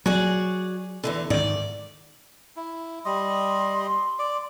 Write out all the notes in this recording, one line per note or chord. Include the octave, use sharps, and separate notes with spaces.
F#3 F#4 G#4 D5
E2 A#2 D3
G#2 D#3 D5
E4
G3 D#5 C6
D5